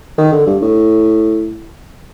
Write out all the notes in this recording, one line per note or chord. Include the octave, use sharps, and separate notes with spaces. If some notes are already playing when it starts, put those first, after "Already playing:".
D#3
D3
G2
A2